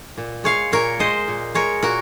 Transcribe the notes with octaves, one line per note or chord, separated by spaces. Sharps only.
A#2
G#3 C#5 F5
A#2 A#4 C#5
G#3 C5 D#5
A#2
G#3 A#4 C#5
A#2 F#4 A#4